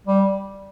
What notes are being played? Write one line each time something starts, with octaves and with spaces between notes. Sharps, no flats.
G3